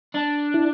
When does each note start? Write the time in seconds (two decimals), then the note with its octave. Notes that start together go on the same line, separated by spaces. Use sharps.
0.14 D4
0.54 E4